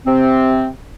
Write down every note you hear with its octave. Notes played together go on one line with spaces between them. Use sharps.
C3 C4